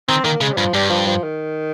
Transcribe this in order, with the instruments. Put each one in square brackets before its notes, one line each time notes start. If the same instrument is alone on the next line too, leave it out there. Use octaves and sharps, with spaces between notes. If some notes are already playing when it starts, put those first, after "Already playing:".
[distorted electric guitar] D#3 [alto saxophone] C4
[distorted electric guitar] D#3 [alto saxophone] A#3
[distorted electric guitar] C#3 [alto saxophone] G#3
[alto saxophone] G3
[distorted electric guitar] G2 [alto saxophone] F3
[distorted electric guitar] G2 [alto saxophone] G3
[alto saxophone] F3
F3
D#3